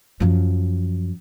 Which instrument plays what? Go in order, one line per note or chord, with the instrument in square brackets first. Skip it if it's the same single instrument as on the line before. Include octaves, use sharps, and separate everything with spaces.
[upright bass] F#2 F3